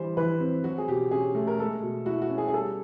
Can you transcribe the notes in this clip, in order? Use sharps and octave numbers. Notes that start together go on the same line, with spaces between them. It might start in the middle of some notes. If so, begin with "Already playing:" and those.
Already playing: E3 G3 C5
E3 B4
C4
F#3 F#4
G#4
B2 G4
C#4 G#4
A3
A#4
G#3 A4
B2
E4 F#4
F#4
C#4
G#4
G#4
G3 A4